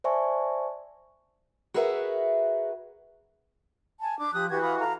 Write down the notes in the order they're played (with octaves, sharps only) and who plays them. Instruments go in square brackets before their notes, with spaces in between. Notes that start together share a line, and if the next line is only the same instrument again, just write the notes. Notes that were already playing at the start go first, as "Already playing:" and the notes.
[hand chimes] C5 D5 E5 G#5 A5 C#6
[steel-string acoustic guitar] F#4 G#4 A#4 B4 E5 F#5
[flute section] G#5 A5
D4 D6
[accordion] F3 [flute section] G4 D#6 F#6
[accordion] E3 F#4 [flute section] G4 G#6
[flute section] F5 B5 D#6
A4 F5 A#5